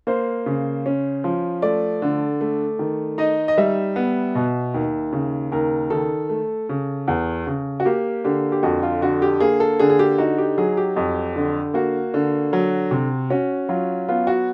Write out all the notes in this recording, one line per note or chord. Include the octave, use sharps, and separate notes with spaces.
A#3 C5
C#3
C#4
F3
A3 D5
D3
A3
D#3
D#4 D#5
D#5
G3 E5
B3
B2
D#2
C#3
D#2 A#4
D#3 A4
A3
C#3
E2
C#3
F#4
A#3 G4
D3 G4
G4
F2 F#4
F4
D3 F#4
G4
A#3 G#4
A4
D3 G#4
G#4
G4
D#4 F#4
G4
F#3 G#4
G4
F2
D3
A#3 F#4
D3
F#3
C3
C#4 F#4
F#3 F4
B3 F4
F#4